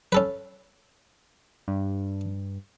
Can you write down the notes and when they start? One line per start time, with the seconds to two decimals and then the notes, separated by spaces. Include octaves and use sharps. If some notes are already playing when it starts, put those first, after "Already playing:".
0.12 C#4 A4 B4
1.68 G2